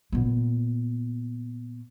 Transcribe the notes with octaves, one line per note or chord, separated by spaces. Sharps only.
A#2 B3